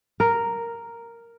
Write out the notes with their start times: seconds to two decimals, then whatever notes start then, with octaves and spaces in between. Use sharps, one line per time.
0.20 A#4